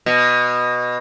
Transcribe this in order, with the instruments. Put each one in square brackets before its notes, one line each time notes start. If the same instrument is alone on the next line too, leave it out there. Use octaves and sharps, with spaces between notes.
[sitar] B2